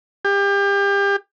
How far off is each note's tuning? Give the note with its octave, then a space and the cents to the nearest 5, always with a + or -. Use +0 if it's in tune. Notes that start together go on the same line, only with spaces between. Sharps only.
G4 +30